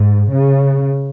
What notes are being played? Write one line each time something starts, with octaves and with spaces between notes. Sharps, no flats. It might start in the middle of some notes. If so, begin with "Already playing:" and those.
Already playing: G#2
C#3